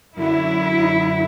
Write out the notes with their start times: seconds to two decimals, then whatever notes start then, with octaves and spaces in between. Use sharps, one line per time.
0.16 F#2 D3 F#3 E4